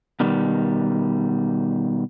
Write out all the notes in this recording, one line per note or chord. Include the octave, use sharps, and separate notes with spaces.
B2 D#3 G3